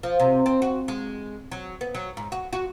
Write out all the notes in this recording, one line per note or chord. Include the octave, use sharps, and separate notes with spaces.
F3
C3
C4
F#4
G#3
F#3
B3
F#3
G#2
F#4
F#4